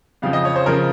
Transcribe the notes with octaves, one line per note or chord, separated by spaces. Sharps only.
F2 C#3 F3 F5
D#5
C#5
C5
C#3 F3 A#4